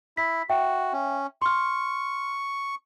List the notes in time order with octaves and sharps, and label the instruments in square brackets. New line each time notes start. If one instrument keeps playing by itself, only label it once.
[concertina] E4 [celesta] B6
[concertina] F#4 [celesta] E5 G5
[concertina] C#4
[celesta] C6 F6 [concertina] C#6